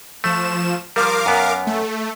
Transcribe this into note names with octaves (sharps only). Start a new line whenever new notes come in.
F3 A3 E7
F3 G3 A#4 F5 D6
F#2 B3
A3